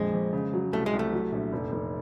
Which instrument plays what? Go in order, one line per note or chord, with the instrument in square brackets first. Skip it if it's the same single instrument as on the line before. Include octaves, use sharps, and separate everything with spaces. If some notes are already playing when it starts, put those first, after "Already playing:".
Already playing: [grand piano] A#1 F2 [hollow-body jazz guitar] G#3
[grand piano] F2
C#3
F#3
[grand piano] C2 [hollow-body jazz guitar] A3
[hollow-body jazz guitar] G#3
[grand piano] C2
[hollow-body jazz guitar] A3
[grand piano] F#3
A#1
F1
F1